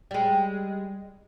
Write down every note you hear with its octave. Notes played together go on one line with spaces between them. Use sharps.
G3 G#3